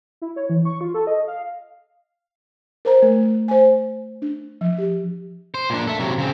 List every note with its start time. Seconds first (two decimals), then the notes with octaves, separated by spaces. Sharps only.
0.22 E4
0.36 C#5
0.50 E3
0.65 C#6
0.81 F4
0.94 A4
1.07 D#5
1.28 F5
2.85 A#4 C5 A#5
3.02 A3
3.48 C5 G#5
4.22 D4
4.61 F3
4.78 G4
5.54 C5
5.70 A#2 D4
5.87 A4 E5
6.00 C3 F#3
6.18 C#3 C4